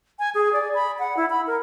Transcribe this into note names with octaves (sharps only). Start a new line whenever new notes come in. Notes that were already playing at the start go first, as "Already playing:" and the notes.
G#5
G#4
D5
B5
F#5
E4
B5
A#4